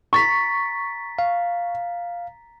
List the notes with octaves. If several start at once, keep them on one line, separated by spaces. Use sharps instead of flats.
A#5 C#6 A6 B6
F5